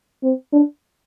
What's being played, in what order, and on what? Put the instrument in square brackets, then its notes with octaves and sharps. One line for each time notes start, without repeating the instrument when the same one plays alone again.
[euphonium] C4
D4